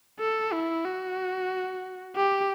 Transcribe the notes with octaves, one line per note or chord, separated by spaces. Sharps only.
A4
E4
F#4
G4